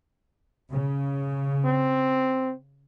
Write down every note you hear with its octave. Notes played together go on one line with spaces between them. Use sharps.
C#3
C4